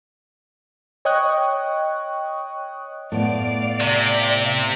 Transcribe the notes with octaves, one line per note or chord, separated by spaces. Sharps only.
C#5 D#5 G5 C#6 D#6 F#6
A2 B3 D5 F5 D7
C3